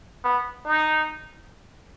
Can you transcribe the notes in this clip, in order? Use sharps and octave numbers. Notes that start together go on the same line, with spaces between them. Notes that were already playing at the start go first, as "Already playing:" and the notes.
B3
D#4